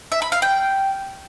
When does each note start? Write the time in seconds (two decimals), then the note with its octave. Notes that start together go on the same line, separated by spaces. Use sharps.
0.12 E5
0.22 B5
0.32 F5
0.42 G5